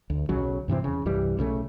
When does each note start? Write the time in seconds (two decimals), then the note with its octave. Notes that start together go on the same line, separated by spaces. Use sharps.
0.10 D2
0.29 B1 C#3 F#3
0.68 G2 C3 E3 C4
0.84 E2 C#3
1.05 C2 G2 E3 G3
1.37 B1 C#3 E3 A3